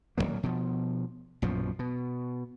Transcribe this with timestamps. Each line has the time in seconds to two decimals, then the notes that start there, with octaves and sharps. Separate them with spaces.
0.18 D1 F2 F#3 A#3
0.43 B2 F3
1.42 A#1 F#2 B2 F3
1.79 B2